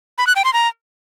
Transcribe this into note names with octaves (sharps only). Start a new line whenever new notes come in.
B5
F#6
G5
C6
A#5